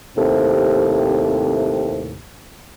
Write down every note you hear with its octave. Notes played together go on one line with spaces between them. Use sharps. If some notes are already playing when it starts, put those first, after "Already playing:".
D#2 A2 C3